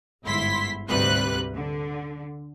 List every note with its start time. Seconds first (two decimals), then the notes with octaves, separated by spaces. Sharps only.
0.24 G1 G#2 E4 C6 B6
0.88 D2 G#2 C3 G3 B4 F#6
1.55 D3